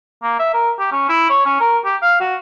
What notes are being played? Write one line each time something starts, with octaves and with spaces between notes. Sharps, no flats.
A#3
E5
A#4
G4
C#4
E4
C#5
C#4
A#4
G4
F5
F#4